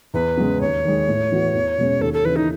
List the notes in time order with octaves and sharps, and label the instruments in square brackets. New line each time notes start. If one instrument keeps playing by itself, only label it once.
[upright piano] E2 [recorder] B4
[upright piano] C#3 G#3 B3
[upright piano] D#2 [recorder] C#5
[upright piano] D#3 G#3
A2
E3 B3 F#4
E2
B2 G#3 C#4
[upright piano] D#2 [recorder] A4
[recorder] A4
[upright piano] C#3 E3 [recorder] B4
[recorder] D#4